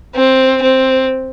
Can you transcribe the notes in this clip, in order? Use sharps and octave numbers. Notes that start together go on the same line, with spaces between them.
C4
C4